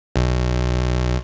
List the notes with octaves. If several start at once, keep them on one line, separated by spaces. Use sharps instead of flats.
B1